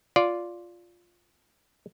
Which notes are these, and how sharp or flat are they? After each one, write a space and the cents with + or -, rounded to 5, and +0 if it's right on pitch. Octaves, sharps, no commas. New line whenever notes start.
F4 +0 D5 -10